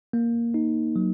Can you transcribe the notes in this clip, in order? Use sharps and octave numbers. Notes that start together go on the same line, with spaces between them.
A#3
D#4
F#3